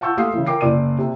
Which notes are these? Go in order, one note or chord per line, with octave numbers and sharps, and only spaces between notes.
F5 F#5 A5 C#6 E6 G6
A3 G4 F5 C6 D#6 C7
C#3 E3
A#4 G5 D6 C7
F#1 D5 D6 D#7
C3